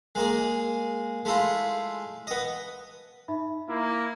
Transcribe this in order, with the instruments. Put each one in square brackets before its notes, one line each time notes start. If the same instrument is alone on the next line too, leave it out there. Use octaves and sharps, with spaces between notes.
[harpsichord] G#3 A#3 G#4
G#3 A3 E4 F4
B3 D#5
[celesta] D#4 E5 B5
[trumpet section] A#3 E4